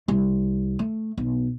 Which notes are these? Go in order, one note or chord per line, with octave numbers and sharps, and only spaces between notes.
C2
A3
B1